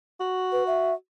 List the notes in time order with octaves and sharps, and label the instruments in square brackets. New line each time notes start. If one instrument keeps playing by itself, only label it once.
[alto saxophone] F#4
[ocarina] B4
E5